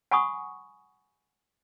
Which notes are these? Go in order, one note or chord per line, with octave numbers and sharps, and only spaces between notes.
F#5 G#5 B5 C#6 D#6